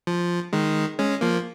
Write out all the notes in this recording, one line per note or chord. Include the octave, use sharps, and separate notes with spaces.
F3
D#3 G#3
G#3 C#4
F3 A#3